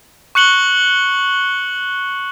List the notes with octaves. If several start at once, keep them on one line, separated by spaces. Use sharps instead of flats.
C#6 F#6 C#7 F#7 G7